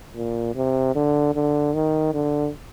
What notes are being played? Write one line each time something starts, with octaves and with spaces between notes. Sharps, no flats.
A#2
C3
D3
D3
D#3
D3